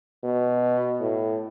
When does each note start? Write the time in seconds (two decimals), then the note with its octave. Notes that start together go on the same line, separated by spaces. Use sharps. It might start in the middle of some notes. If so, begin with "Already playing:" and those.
0.24 B2
1.00 A2